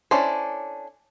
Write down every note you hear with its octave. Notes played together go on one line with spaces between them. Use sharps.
C#4 D4 E4 A4 C5